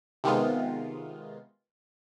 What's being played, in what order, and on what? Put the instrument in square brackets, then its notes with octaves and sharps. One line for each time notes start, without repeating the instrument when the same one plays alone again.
[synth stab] C3 D#3 G#3 B3 F4